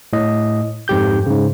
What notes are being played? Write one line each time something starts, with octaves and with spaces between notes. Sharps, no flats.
A2 D#5
F2 G#2 G4 G6
G#2 C#3